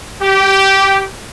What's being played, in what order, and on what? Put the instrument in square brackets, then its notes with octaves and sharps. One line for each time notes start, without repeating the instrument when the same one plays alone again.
[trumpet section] G4